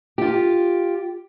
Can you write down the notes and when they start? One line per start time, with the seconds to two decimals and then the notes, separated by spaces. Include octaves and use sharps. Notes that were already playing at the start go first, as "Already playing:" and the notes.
0.18 F4 G4